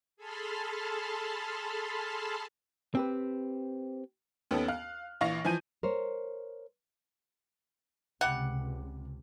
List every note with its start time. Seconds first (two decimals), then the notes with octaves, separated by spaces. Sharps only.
0.17 G#4 A4 A5 B5 C6 F6
2.95 C4 G4 B4
4.51 D#2 B3 C#4 A4
4.68 F5 F6 F#6
5.21 A#1 E3 F5 C#6 A#6 F7
5.44 E3 F3 G#5 G6 D#7
5.83 A#4 C5 C#5
8.21 C#2 C3 G3 F#5